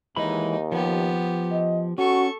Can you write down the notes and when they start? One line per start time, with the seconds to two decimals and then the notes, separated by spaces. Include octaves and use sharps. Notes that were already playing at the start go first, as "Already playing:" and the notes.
0.16 D#2 E3 G#3 D#4 B5
0.72 F3 B3 G4
1.51 D#5
1.98 C#4 F#4 A4 C#6